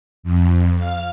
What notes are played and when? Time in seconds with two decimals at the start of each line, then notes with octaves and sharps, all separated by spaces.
0.23 F2
0.77 F5